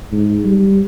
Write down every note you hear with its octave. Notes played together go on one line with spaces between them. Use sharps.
G#2
G3